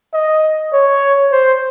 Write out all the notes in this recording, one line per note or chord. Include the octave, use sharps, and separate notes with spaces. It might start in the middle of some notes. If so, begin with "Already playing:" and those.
D#5
C#5
C5